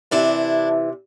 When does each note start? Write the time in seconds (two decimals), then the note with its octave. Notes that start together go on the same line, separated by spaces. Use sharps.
0.11 C3 E3 D4 E4